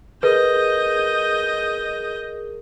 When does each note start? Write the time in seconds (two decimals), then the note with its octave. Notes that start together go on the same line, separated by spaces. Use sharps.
0.23 G#4 A#4 B4 D#5 G6